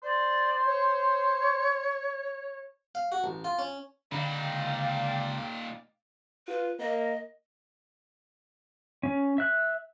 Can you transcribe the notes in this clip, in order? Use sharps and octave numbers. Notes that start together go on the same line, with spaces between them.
C5 D5
C#5
F5
F#4
A1
F4
C#4
C#2 A#2 D3 D#4 D5 F5 G5 B5
F4 B4
A#3 D#5
C#4
E5 F#6